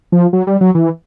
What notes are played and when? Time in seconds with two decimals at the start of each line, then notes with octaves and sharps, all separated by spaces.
0.12 F3
0.33 F#3
0.47 G3
0.61 F#3
0.75 E3